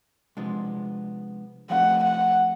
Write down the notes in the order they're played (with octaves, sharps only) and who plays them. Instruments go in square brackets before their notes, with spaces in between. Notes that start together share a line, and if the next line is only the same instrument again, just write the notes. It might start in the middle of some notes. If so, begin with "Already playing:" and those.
[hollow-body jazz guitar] C3 F3 G#3 B3 D4
[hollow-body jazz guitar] F3 A3 C4 D#4 G4 [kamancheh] F#5
[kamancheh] F#5